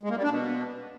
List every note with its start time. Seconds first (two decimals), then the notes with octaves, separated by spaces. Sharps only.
0.03 G#3
0.10 A#3
0.17 G3
0.23 D4
0.30 B2